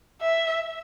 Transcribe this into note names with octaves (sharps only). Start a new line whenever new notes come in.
E5